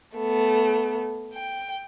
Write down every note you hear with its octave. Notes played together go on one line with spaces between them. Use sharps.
A3 B3
G5